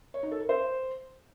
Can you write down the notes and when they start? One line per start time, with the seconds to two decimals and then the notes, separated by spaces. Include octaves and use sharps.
0.14 C#5
0.23 D#4
0.32 A4
0.40 A#4
0.49 C5